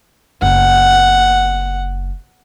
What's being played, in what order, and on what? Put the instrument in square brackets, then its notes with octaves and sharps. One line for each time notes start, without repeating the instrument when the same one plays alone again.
[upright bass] F#1 [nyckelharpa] F#5